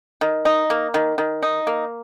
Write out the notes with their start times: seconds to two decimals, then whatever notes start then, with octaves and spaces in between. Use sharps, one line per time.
0.21 D#3
0.45 D#4
0.70 A#3
0.94 D#3
1.18 D#3
1.43 D#4
1.67 A#3